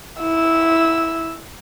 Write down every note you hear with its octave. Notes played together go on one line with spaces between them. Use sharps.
E4 E6